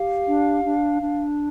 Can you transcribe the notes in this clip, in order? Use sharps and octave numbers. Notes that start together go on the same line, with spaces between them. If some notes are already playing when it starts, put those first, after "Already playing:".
Already playing: G4 F5
D4
D4
D4